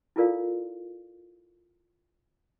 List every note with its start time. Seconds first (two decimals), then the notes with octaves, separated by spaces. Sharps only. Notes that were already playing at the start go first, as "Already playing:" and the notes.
0.16 E4 F4 A4 A#4 D5 F5